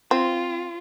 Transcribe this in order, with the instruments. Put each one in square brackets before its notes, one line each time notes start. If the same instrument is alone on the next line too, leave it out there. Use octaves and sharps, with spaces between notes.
[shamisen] C4 [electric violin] F4